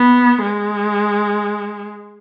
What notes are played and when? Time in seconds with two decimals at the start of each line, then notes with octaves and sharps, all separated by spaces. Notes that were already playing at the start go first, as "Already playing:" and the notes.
Already playing: B3
0.42 G#3